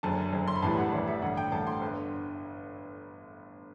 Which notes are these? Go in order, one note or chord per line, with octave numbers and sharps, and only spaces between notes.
F#1 F#2 D3 A5
F#1 F#2 D3
C6
B5
A1 A2 E3 G3 A5
F#5
A1 A2 E3 G3 D5
E5
A1 G2 D3 A3 F#5
G5
A1 G2 D3 A3 A5
C6
G1 D3